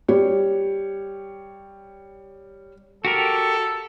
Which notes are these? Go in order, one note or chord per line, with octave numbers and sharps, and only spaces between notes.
G3 C#5
F#4 G4 A4 A#4